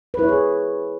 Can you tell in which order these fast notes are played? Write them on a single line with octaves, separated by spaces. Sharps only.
B4 E4 C#5 G#4